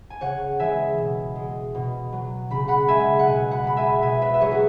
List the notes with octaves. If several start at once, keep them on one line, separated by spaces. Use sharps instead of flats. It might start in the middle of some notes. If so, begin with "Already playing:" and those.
G#5
C#3 C#5 F#5
E3 G#3 E5 G#5
B2
G#3
B2
F#3
C#3 B5
F#5 B5
G#3 E5 G#5
F#5
B2 E5 G#5
F#5 B5
G#3 B5
E5 G#5
B2 E5 G#5
B4 E5
E5
F#3 G#4 C#5
F#4